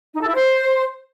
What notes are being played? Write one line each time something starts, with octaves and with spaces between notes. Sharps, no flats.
D#4
A4
E4
C5